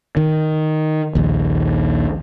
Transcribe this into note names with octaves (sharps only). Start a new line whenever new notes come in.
D#3
A#1 D#2